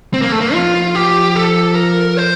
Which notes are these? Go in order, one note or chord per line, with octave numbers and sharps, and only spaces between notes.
C4
A#3
A3
A#3
F3 F4
G4
A4
A#4
C5